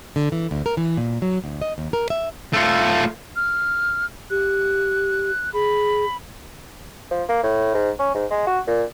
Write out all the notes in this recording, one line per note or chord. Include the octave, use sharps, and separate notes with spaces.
D3
E3
D2
A#4
E3
A#2
F#3
D2
D#5
D#2
A#4
E5
A3 F4
F6
G4 F#6
G#4 B5
F3
A#3
A2
G#2
C#4
G#2
G#3
F#4
A#2